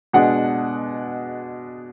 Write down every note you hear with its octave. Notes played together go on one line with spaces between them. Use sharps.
B2 G#3 D4 F#5